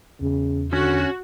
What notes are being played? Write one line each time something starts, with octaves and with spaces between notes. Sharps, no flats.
E2 C#3
D3 C#4 F#4